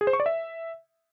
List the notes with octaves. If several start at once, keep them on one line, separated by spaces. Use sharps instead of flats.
G#4
C5
C#6
D5
E5